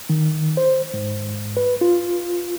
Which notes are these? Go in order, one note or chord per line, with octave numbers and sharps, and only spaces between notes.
D#3
C5
G#2
B4
F4